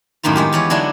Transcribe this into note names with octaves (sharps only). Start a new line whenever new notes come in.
F#2 A2 D#3 A#3 F4
G#3 B3 G4
E2 B3 C#5
D3 F#3 G#3 D4 E4